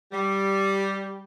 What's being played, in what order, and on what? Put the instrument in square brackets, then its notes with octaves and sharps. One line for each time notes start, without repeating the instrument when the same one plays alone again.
[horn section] G3